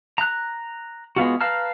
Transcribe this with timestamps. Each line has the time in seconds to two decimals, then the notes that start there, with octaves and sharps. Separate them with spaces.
0.18 A#5 F#6
1.16 G#3 B3 F4 F#4
1.41 B4 F5 A5 A#5 F6